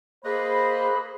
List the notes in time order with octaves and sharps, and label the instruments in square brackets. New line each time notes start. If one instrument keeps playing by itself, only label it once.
[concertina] A#3 B4 D#5 [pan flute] G#4 [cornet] C5 [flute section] B5